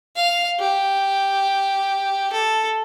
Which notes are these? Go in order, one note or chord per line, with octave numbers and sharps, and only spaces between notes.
F5
G4
A4